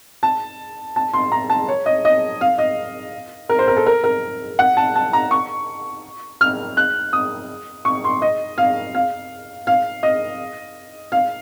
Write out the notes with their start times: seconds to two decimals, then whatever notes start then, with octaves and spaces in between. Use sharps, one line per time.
0.23 A5
0.96 A5
1.14 C6
1.32 A#5
1.50 A5
1.68 C#5
1.86 D#5
2.05 D#5
2.41 F5
2.58 D#5
3.49 A#4
3.59 C5
3.68 A#4
3.77 A4
3.86 A#4
4.04 A#4
4.59 F#5
4.77 A5
4.96 A5
5.13 A#5
5.31 C#6
6.41 F6
6.77 F#6
7.13 D#6
7.85 C#6
8.04 C6
8.22 D#5
8.58 F5
8.95 F5
9.67 F5
10.03 D#5
11.12 F5